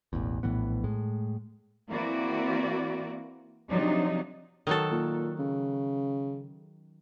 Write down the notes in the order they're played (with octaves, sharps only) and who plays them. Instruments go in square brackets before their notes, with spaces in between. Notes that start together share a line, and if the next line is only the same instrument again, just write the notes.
[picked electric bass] E1 A1 E2
A#1 A2 E3 B3
A2 G#3
[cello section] E3 A#3 C4 E4 F#4 D5
C3 F3 F#3 D4 D#4
[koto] D#3 F#3 A4
[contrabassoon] A#2
C#3